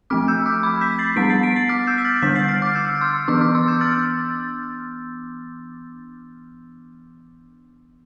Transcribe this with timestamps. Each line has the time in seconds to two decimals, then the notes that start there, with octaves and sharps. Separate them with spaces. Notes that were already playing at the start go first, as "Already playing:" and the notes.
0.10 F3 A3 C4 D6 F6
0.28 E6 G6
0.46 D6 F6
0.63 B5 D6
0.81 G6 B6
0.99 A6 C7
1.16 G3 B3 D4 B6 D7
1.29 A6 C7
1.43 B6 D7
1.56 A6 C7
1.69 D6 F6
1.87 E6 G6
1.98 B6
2.05 F6 A6
2.17 A6
2.22 D3 G3 D4 G6 B6
2.35 A6 C7
2.48 F6 A6
2.62 D6 F6
2.75 E6 G6
2.95 F6
3.01 C6 E6
3.28 E3 B3 D4 D6 F6
3.41 D6 F6
3.54 C6 E6
3.67 E6 G6
3.81 F6 A6